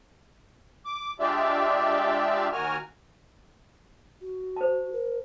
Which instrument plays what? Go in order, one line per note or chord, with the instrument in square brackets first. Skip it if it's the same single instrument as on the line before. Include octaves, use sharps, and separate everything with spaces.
[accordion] D6
G#3 D4 F4 G4 D5 E5
D#2 F#4 A#4 G#5 F6
[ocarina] F#4
[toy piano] C5 A5
[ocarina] A#4